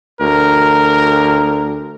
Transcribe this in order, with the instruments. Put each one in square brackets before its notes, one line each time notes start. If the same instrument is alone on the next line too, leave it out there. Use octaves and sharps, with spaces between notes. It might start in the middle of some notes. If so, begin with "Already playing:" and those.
[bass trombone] D2 [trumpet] A#4